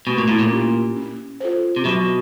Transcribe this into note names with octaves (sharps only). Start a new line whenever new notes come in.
B2 A3
A#2
A2
A#2
C#4 E4 G4
C#4
F4 A4 C5
C3
B2 F#3